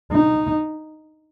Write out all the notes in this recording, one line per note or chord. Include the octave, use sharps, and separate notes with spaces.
D#4